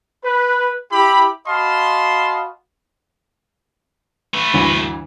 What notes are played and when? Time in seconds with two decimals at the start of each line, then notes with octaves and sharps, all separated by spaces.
0.24 B4
0.92 E4 G4 B5
1.47 F#4 D#5 F5 A5 B5 C6
4.34 A3 B4
4.54 D2 G2 E3